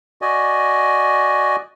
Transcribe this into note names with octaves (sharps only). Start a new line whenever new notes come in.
F#4 D5 D#5 G#5